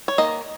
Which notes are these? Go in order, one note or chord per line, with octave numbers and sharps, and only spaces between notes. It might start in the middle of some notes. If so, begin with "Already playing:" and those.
C#5
D#3 A#3 D#5